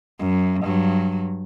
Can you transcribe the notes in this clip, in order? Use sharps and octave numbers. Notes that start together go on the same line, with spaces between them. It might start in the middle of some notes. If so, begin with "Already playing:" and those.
F#2
G2 F#3